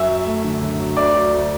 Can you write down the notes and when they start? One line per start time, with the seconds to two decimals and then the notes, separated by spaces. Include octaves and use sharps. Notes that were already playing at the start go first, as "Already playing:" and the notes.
Already playing: F#2 E5 E6
0.08 F#3
0.25 A3
0.44 D3
0.61 F#2
0.79 F#3
0.97 D2 D5 D6
1.15 F#3
1.33 D2